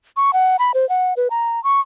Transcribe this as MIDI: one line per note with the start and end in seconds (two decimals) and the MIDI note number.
0.17 0.33 85
0.33 0.56 78
0.59 0.72 83
0.74 0.88 72
0.89 1.14 78
1.17 1.28 71
1.30 1.62 82
1.64 1.80 85